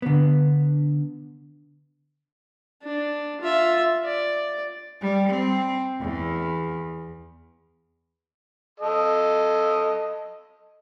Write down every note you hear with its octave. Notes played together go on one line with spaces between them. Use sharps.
D3 B3
D4
F4 E5
D5
G3
C4
E2
A4 D#5